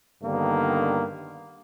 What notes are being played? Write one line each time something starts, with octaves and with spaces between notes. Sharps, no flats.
G2 D3 D#3 A#3 B3